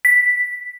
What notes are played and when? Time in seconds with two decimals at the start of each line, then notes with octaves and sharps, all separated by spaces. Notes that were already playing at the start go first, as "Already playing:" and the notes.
0.05 B6